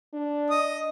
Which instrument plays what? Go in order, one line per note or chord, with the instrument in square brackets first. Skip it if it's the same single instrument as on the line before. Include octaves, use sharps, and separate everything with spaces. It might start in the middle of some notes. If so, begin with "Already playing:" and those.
[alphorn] D4
[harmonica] D#5 D#6